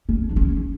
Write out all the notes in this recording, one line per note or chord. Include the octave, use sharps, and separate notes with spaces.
C#4
D4
C#4